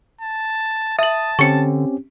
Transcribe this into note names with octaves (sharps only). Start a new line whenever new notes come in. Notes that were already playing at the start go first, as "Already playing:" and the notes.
A5
E5 A5 D#6 F#7
D3 C4 C#4 G4 C#6 C#7